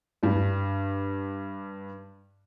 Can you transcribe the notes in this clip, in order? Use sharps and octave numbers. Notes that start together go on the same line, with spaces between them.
G2 G3